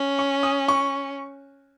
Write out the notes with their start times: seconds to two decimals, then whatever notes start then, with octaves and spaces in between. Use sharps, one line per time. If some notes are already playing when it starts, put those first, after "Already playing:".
Already playing: C#4
0.19 C#6
0.43 D#6
0.68 C#6